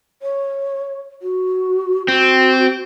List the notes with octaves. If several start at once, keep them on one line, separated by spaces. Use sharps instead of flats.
C#5
F#4
C4 F#4